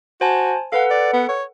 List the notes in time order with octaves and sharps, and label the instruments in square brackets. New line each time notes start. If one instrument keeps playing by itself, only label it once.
[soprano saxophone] F#4 [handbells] C5 G#5 A5
[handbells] A4 B4 F#5 [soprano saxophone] F5
[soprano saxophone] D5
B3
C#5